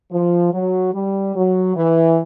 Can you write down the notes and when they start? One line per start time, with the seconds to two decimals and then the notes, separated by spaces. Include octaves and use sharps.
0.12 F3
0.53 F#3
0.94 G3
1.36 F#3
1.76 E3